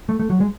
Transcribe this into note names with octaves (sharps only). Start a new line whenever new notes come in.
A3
A3
F#3
G#3